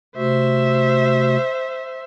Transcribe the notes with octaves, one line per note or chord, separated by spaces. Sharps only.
C3 A3 F#4 C5 E5